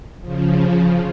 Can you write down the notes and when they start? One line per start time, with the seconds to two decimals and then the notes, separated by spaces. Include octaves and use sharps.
0.21 C#3 F3